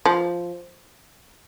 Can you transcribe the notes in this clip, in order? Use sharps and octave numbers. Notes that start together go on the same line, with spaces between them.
F3